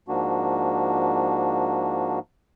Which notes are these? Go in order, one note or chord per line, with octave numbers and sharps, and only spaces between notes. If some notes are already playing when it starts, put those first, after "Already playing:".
G#2 F3 A#3 D4 F#4